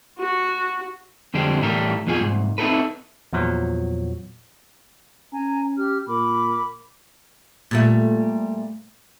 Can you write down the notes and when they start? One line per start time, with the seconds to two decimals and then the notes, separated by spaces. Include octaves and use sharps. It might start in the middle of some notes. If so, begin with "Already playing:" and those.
0.18 F#4
1.34 F2 D3 G3 G#3 C4
1.62 A2 E3 G3 A4 A#4
2.07 F2 B2 F4 G#4 G#5
2.20 C2 G#2
2.58 C4 D#4 E4 G4 A4 B4
3.33 E2 A#2 F3 F#3
5.33 C#4 G#5 A#5
5.78 G4 F6
6.07 A#2 A#4 B5 D6
7.71 A#2 G3 A3